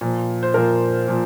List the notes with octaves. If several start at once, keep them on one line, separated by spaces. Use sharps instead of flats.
A#2 F3
C5
A#2 F3 A#4
A#2 F3